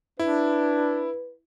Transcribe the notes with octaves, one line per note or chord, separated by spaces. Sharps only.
D4 E4 B4